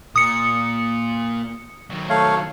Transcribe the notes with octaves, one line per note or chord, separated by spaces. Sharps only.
A#2 D#6 C#7
D#3 F#3
A3 C#5 F5